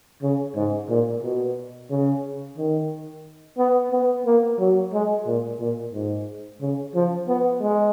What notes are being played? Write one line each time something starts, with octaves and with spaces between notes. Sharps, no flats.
C#3
G#2
A#2
B2
C#3
D#3
B3
B3
A#3
F#3
G#3
A#2
A#2
G#2
C#3
F3
B3
G#3